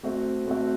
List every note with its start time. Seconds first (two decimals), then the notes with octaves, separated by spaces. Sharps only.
0.03 A3 C4 F#4 C5 E5
0.47 A3 C4 F#4 C5 E5